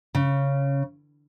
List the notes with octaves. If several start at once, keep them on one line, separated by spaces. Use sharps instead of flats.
C#3